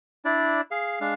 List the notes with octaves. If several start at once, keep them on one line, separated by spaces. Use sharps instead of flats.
D4 E4 D5
G#4 F5
G#3 D4 F5